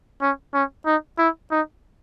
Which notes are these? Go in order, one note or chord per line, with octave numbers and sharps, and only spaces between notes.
C#4
C#4
D#4
E4
D#4